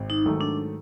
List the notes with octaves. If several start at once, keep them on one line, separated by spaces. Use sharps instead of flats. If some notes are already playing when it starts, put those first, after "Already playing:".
Already playing: G#1
D#4
G#2 D#3 F#3 A3
D4